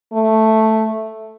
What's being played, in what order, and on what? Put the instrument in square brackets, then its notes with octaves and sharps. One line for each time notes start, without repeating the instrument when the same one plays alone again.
[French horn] A3